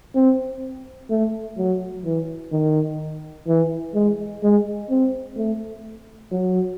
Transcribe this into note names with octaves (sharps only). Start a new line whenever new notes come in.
C4
A3
F#3
E3
D#3
E3
G#3
G#3
C4
A3
F#3